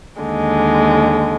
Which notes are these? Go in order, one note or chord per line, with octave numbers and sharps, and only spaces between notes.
D#2 D3 G#3